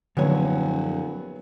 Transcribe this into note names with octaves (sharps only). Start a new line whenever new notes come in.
D#1 F#2 D3 F3 F#3 B3 C#5